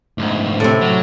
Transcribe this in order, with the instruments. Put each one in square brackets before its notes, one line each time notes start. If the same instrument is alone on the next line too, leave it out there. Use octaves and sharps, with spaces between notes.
[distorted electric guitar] D2 G#2
[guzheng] A2 C3
[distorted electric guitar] F#3